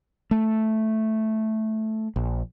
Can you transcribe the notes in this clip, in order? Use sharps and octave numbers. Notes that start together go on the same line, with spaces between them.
A3
A#1